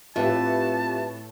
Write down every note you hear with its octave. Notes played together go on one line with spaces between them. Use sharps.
A2 C4 F4 G4 B4 E5 A5